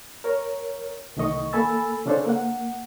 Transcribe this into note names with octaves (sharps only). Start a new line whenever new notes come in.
A#4 C#5
C2 D#3 A3 D#5 C#6
A#3 A4 G#5 B5 E6 A6
C#3 C#4 D4 A4 C5
A#3 F#5